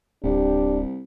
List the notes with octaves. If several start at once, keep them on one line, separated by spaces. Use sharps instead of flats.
D1 C2 D4 G4